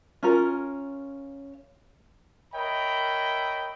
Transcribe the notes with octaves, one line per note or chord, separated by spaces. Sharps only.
C#4 F4 A#4
A#4 C#5 D#5 E5 G5 B5